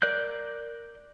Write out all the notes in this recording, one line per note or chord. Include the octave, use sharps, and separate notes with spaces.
A#4 D5 F#6 G6